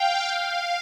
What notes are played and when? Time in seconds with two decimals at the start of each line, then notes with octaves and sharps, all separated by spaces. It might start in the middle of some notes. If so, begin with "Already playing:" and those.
Already playing: F5 G5
0.28 F5